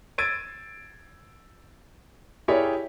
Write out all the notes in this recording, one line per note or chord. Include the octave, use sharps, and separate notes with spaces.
E6 G#6 A6 D7 D#7
E4 G4 G#4 A#4 C#5 D5